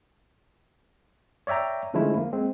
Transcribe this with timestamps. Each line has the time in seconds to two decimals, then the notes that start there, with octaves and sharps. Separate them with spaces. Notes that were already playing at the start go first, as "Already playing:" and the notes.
1.47 C#5 D5 E5 G5 A#5
1.94 D3 F3 G#3 A3 C#4 E4
2.17 A#3
2.33 G#3 C4